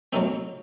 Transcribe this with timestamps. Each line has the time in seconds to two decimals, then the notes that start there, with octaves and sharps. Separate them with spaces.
0.13 A2 F#3 A3 C4 D#4